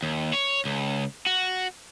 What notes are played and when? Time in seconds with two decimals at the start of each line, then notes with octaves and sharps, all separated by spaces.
0.03 D#2
0.33 C#5
0.65 C#2
1.26 F#4